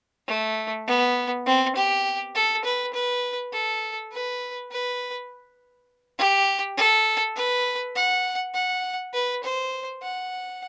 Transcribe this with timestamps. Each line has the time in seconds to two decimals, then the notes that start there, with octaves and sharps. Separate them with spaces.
0.28 A3
0.87 B3
1.46 C4
1.76 G4
2.35 A4
2.65 B4
2.94 B4
3.53 A4
4.12 B4
4.71 B4
6.19 G4
6.77 A4
7.36 B4
7.96 F#5
8.54 F#5
9.14 B4
9.44 C5
10.03 F#5